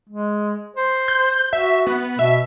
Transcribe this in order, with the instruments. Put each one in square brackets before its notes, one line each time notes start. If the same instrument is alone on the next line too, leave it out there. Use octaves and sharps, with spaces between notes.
[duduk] G#3
C5
[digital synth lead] G6
[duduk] F#4 [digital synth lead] E5
[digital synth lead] B3
[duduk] B2 [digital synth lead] E5